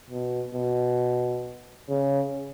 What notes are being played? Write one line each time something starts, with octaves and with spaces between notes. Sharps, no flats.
B2
B2
C#3